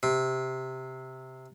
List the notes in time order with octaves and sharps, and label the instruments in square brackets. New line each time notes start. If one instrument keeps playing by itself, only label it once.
[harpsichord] C3